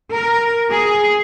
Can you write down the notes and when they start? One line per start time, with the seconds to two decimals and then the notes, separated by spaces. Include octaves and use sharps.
0.14 A#4
0.69 G#4